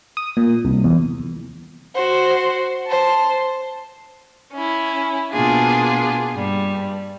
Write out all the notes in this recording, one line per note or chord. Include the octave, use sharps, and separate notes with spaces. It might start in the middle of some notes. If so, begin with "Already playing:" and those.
D#6
A#2
C2
E2
F#4 C5
C5 A5
C#4 E4
B2 A#3 B3 D4 F4 G#4
G2 G3